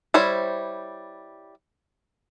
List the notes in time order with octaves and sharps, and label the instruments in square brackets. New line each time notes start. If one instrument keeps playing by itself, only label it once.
[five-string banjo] G3 E4 C5 C#5